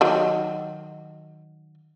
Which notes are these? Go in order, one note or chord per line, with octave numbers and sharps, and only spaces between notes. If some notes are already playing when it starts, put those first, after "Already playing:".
D#3 F#3